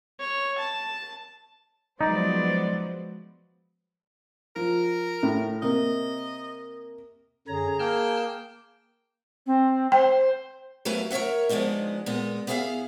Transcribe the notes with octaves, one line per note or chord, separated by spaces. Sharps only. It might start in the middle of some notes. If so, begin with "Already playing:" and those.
C#5
A5
F3 F#3 G#3 B3 D#4 C5 D5
F3 A#4
A2
C3 A#3 D#5
F#2 D3 G#4 C#5 A#5
A#3 G5 A5 F6
C4
C5 G5
F#3 A3 B3 E4 B4 F5
A#4 C#5 D5 E5 F#5
F3 G#3 B3 D4 D#4
A#2 G#3 B3
B3 E4 G#4 D5 E5 F5